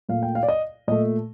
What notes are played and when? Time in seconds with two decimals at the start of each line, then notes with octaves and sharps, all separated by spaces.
0.09 A#2 A3 F5
0.23 G5
0.35 F5
0.43 D5
0.48 D#5
0.88 A#2 A3 D#5